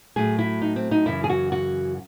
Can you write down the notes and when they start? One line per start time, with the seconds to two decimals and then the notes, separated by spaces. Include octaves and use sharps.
0.16 A2 F#3 A3 G#4
0.39 E4
0.62 D#4
0.76 C4
0.91 D#4
1.06 F#2 C#3 E3 E4
1.24 G#4
1.29 F#4
1.52 F#4